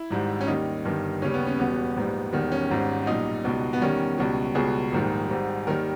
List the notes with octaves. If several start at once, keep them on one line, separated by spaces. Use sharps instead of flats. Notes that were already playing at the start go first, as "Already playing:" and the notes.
Already playing: E4
G#1 G#2 G3
C#4
D#2 D#3 G3 D#4
G1 G2 D#3 G3
D#2 C#3 G3 C#4
B3
C#4
E1 E2 B2 G3 B3
A#1 G#2 G3
E1 E2 D#3 G3
C#4
G#1 G#2 G3
B1 A#2 G3 D#4
C#2 B2 G3
B3
E2 D#3 G3 C#4
C#2 B2 G3
C#2 B2 G3 G#4
A#1 G#2 D#3 G3
G#1 G#2 G3
D#2 D#3 G3 A#4